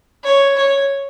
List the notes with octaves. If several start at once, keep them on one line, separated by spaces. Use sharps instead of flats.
C#5
C#5